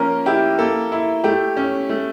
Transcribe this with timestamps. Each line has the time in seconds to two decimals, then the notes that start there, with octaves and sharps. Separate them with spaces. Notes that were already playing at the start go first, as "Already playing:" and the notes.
Already playing: F3 A#3 C#4 A#4
0.26 E4 G4
0.58 A#3 A4
0.92 E4
1.24 A3 G4
1.57 C#4
1.89 A3